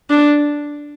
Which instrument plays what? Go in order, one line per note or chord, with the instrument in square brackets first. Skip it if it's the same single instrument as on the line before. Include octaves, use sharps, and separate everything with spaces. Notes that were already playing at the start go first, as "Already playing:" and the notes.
[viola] D4